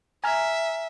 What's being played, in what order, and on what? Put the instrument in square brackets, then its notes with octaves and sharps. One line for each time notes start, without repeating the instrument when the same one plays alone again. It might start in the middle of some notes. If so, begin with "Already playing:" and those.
[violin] E5 [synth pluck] G#5 A#5 F6